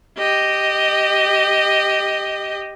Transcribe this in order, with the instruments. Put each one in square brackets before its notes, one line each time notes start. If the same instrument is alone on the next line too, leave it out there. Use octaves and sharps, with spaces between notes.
[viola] G4 D#5